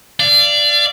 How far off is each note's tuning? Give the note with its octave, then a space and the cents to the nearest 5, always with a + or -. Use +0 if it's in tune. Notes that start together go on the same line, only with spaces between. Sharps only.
D5 +0 F5 -35